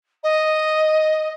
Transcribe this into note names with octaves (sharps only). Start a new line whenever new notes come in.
D#5